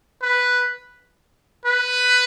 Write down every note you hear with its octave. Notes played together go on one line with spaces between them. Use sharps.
B4
B4